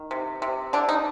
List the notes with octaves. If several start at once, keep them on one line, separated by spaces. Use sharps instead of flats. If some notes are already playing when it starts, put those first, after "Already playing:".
Already playing: D#3
C3
C3
D3 D4
D#4